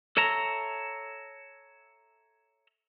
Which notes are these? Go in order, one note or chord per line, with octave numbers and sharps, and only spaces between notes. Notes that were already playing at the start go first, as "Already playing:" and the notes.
A4 C#5 E5 A5 A#5